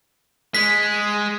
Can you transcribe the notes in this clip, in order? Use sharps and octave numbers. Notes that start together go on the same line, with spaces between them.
G#3 B6